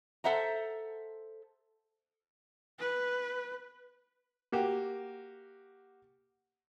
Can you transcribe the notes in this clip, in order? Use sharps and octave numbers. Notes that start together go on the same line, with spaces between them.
A4 C5 E5 F#5 A#5
B4
A#3 F#4 G4